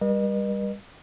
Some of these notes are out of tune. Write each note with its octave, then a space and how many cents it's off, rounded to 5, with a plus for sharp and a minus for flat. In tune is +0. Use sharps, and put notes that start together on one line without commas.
G3 +25 B4 -45 D#5 -40